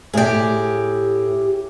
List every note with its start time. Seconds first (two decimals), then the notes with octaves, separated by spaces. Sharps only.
0.14 A2 G4 G#4